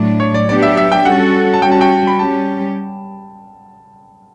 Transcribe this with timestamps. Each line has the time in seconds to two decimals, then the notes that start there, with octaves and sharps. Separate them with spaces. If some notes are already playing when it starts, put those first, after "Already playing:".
Already playing: A2 F#3 A3 D4
0.20 C#5
0.34 D5
0.49 F#3 B3 D4 G4 D5
0.62 E5
0.77 E5
0.92 G5
1.05 G3 C#4 F#4 A4 F#5
1.53 A5
1.62 G3 C#4 F#4 G5
1.71 A5
1.81 G5
2.07 B5
2.19 G3 C#4 G4 A5